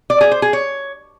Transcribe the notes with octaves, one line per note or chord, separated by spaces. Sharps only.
D5
G#4
C5
G#4
C#5